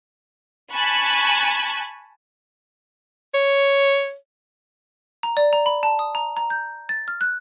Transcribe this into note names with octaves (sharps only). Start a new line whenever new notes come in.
G#5 A5 B5 C#6 F#6
C#5
A#5
D5
A#5
B5
A5
D#6
A#5
A#5
G6
A6
F6
F#6